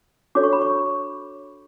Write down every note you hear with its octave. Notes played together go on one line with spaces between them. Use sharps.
D4 F#4 A4 C#5 D6
C#6
B5
C#6